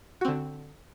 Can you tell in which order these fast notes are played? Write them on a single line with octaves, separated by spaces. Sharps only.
F#4 C4 D3